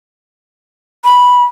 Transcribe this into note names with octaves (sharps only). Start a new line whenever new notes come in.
B5